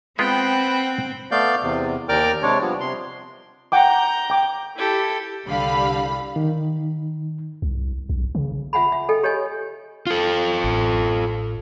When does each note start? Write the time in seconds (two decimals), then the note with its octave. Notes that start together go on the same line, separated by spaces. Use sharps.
0.19 G#3 B3 C4 F4 B4 F#5 G5
1.31 A3 B3 D5 F5 G6
1.63 E2 C3
2.09 D#2 A#4 D5 G5 D6 F6
2.42 C3 G#3 D4 C#5
2.61 F3 G3 B3
2.80 C3 C6
3.72 F#5 G5 A#5 D6 G6
4.30 G5 D6
4.75 E4 G4 A4
5.46 C2 D3 G3 F5 B5
6.36 D#3
7.62 C2
8.09 B1
8.35 C#3
8.73 F4 E5 F#5 G#5 B5
8.92 E5
9.09 A4 D#5 G5 G#5
9.23 G4 C#5 D#5 G#5
10.07 F4 A4
10.64 A1